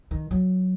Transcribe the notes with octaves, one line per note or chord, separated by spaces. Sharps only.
D#3
F#3